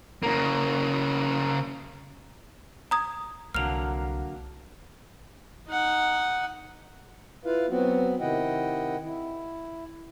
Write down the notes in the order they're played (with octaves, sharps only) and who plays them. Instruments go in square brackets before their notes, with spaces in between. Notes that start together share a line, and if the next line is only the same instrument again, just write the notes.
[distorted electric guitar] C#3 A#3
[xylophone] A#5 D#6 G#6
[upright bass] C2 [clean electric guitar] D3 F#3 A#3 [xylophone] F6 F7
[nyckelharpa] D#4 F#5
[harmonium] E4 F4 B4 F5
F#3 B3 C4 F#4
C3 D#3 E4 D#5 F#5 G5
E4